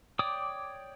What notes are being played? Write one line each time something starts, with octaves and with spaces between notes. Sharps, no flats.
C#5 D5 G5 D6 D#6